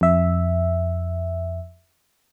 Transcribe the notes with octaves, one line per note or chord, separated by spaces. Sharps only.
F2 E5